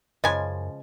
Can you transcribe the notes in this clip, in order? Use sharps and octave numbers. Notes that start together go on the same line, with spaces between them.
F#2 C#3 F3 G#3 D#5 G#5